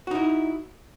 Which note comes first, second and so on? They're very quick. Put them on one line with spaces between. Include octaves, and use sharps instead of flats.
F#4 D#4 E4